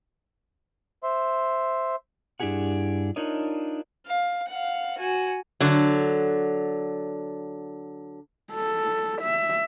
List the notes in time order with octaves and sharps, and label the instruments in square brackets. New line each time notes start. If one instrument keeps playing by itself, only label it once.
[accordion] C5 E5 C6
[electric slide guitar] G2 D4 E4 G4 G#4 F#5
D4 D#4 F4 A#4 C#5 D#5
[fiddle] F5
F5 F#5
F#4 G#5
[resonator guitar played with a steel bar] D3 F#3
[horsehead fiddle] A4
E5